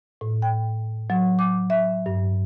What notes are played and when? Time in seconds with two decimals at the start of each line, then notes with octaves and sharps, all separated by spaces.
0.21 A2
0.42 G5
1.10 F#3
1.39 D6
1.70 E5
2.06 G2